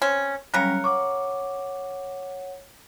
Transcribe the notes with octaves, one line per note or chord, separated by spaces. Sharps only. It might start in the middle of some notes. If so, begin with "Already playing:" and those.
C4 C#4
C#3 F#3 G3 C#4 A#4 F#6 C#7
C#5 F#5 C#6 D6